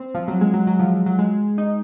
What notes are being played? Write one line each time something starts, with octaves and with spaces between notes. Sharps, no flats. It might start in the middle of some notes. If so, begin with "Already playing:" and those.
Already playing: C4
F3
F#3
G#3
F#3
F#3
F3
F3
F#3
G#3
D#4